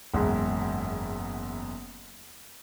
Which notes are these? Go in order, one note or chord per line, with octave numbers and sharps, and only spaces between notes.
F#1 E2 G#2